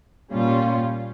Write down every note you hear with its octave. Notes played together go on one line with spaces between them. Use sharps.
A#2 G3 C#4 F4